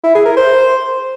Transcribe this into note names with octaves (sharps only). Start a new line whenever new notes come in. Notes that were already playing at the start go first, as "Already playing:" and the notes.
E4
G#4
A#4
C5